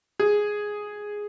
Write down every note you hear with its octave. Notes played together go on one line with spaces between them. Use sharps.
G#4